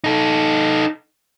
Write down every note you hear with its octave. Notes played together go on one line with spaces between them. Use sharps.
D#4 A4